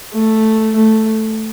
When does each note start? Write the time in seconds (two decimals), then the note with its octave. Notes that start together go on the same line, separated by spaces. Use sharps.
0.13 A3
0.75 A3